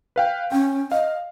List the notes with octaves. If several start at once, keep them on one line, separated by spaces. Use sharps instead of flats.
B4 F5 G5
C#4 G5
D#5 F5